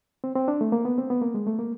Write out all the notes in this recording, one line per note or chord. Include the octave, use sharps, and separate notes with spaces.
C4
C4
D4
A3
A#3
B3
C4
B3
A#3
G#3
A3
A#3